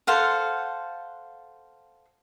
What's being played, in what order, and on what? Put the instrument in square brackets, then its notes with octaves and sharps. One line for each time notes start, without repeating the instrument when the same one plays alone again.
[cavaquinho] A4 C5 F5 F#5